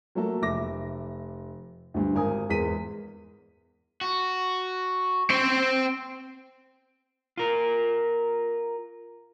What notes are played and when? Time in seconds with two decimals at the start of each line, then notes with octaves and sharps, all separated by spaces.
0.15 F#3 A3 A#3 A4
0.42 F1 E5 D6 A#6
1.94 D2 G2
2.15 G#1 A#4 G#5 D#6
2.49 E2 G#2 A#4 B6 D#7
4.01 F#4
5.30 C4 C5
7.37 F4 A#4